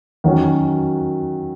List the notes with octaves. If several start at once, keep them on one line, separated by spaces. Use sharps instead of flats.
D#3 F#3 C#4 F#4